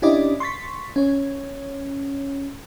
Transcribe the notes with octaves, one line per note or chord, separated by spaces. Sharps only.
C#4 D4 E4 G4 D5 D#5
C6 C#6 A6 B6
C#4 C#5